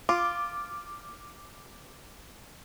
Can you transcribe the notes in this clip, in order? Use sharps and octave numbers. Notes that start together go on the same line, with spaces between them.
F4 D6